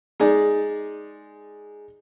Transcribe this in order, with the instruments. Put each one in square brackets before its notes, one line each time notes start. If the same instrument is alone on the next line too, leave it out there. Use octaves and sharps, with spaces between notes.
[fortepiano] G#3 D#4 G#4 D5